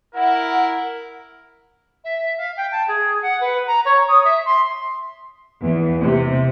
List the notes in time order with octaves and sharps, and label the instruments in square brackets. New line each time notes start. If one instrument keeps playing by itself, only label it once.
[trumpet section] E4 A#4 [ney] F#5
[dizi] E5
F5
G5
A5
G#4
F#5
B4
A#5
C#5
D#6
E5
C6
[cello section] E2
C3